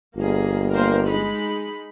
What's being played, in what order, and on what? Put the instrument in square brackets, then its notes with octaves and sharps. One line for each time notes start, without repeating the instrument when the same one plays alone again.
[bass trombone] G1 [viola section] A#3 G#4
[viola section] A#3 A#4 C5
G#3 D#4 B5